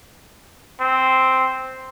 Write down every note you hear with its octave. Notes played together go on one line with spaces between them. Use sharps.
C4